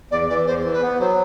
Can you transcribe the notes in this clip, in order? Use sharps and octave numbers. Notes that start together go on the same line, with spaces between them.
E2 D5
E3 D5
E2 C5
E3
B4
B3
F#3 C5